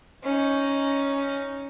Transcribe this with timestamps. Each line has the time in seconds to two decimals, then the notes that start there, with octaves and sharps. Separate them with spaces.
0.23 C#4 D#4